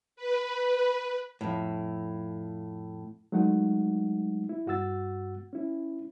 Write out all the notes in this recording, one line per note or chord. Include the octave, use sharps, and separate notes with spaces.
B4
F2 A2
F#3 G#3 A3 D#4 F#5
E4
G2 F#4 F#5 E6 A6
C#4 E4